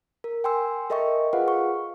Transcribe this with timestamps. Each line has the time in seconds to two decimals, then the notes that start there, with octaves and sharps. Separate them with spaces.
0.24 A#4
0.44 G5 G#5 C6 E6
0.90 A4 A#4 D#5 E5 G5 C#6
1.33 F4 G#4 B4 F5 F#5
1.48 C#6